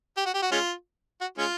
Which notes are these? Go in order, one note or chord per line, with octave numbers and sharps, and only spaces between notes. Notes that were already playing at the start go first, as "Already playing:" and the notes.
G4
F#4
G4
F#4
G#3 C#4 F4
F#4
G#3 C#4 F4